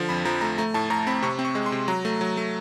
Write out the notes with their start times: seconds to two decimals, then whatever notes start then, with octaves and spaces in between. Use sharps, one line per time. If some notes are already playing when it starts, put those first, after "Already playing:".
Already playing: D3 F3
0.09 F2 B5
0.25 F3 A#5
0.41 A3 A#5
0.58 A3 A#5
0.74 A2 A5
0.90 A2 A#5
1.07 C4 B5
1.22 C3 C#6
1.39 C4
1.45 C#6
1.55 G#3
1.66 C6
1.72 C3
1.88 F#3 A#5
2.05 A3
2.21 F#3
2.37 A3